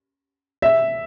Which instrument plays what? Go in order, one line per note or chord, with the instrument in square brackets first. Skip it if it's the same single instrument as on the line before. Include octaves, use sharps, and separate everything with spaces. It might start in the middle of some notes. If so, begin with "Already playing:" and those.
[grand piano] E5